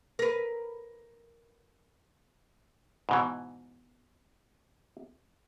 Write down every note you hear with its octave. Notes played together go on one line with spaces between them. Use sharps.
A#4 B4
G#2 B2 E3